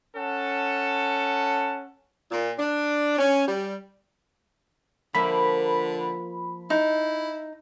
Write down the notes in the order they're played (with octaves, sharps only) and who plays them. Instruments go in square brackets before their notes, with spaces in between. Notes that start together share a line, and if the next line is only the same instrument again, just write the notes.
[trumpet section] C#4 A4 F#5 A5
[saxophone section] A#2
D4
C#4
G3
[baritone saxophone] D3 [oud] F3 A#3 E5 [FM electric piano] B5
[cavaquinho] D#4 [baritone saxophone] E4